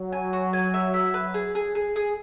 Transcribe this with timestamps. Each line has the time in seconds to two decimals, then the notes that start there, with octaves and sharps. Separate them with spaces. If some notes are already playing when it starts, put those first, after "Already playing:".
Already playing: F#3
0.12 G#5
0.33 F#4
0.53 G#5
0.74 E5
0.94 E5
1.14 B4
1.34 G#4
1.55 G#4
1.75 G#4
1.96 G#4